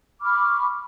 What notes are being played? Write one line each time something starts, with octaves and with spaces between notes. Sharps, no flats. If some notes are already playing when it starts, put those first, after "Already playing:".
B5 C#6 D6 F6